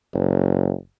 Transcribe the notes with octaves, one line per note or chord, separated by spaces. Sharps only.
F#1